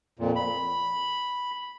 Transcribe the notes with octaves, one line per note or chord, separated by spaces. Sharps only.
F2 A#2
B5